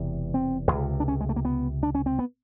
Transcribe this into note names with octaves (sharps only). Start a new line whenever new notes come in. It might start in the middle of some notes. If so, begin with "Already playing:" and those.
Already playing: E1 E2 C3
C4
C#2 C3
D4
C#4
G#3
A3
A#3
B3
D4
C#4
C4
B3